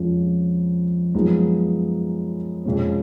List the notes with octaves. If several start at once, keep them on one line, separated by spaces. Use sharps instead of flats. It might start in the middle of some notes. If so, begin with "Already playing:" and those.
Already playing: F2 F3 G#3 C#4
F#2 F3 G#3 B3 D#4
F2 F3 G#3 C#4